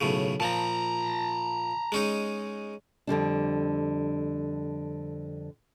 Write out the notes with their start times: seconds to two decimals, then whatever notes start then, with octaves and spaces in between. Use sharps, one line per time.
0.01 B1 A2 C#3
0.40 A#2 F3 A5 A#5
1.92 G#3 C#4 D#4
3.07 F2 D3 G3 D4